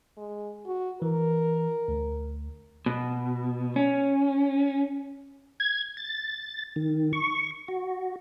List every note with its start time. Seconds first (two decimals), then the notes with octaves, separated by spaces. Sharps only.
0.17 G#3
0.66 F#4
1.02 E3 A#4
1.88 D2
2.86 B2
3.76 C#4
5.60 G#6
5.97 A6
6.76 D#3
7.13 C#6
7.68 F#4